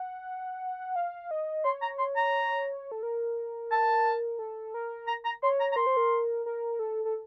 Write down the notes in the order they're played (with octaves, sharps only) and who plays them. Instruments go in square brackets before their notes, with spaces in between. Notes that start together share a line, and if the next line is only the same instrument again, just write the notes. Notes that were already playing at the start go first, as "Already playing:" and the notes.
Already playing: [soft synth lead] F#5
F5
D#5
[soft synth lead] C#5 [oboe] C6
[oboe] A#5
C6
A#5
[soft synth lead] A4
A#4
[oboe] A5
[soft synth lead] A4
A#4
[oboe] A#5
A#5
[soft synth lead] C#5 [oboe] C6
[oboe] A#5
A#5
[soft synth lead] A#4 [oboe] C6
[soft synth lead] C5
A#4
A#4
A4
A4